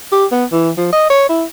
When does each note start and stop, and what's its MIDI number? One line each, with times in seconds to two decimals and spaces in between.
0.13 0.25 67
0.32 0.45 59
0.53 0.70 52
0.78 0.92 53
0.93 1.06 75
1.10 1.27 73
1.29 1.44 64